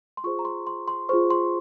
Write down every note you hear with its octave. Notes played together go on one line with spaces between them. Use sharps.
C6
F4 G#4 C5 C#6
A#5
C6
C6
C6
F4 G#4 C5 C#6
C6